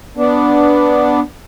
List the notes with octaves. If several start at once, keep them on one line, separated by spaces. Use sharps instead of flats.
B3 D4